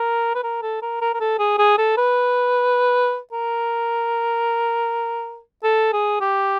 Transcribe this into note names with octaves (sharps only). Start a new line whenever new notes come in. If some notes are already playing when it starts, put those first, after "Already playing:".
Already playing: A#4
B4
A#4
A4
A#4
A#4
A#4
A4
G#4
G#4
A4
B4
A#4
A4
G#4
G4